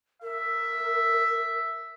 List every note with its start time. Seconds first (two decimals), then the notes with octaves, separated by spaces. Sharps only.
0.22 A#4 E5